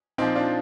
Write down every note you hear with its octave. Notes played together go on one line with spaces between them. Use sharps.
A#2 F3 C4 D#4
D4 F4